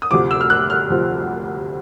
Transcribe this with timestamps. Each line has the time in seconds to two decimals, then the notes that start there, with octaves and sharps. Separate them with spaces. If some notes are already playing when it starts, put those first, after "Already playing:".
0.02 D#6
0.11 D2 C3 F3 D6
0.31 E6
0.41 F6
0.50 F#6
0.70 F6
0.90 D2 C3 F3